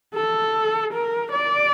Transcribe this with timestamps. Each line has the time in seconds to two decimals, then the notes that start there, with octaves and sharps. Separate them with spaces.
0.15 A4
0.93 A#4
1.32 D5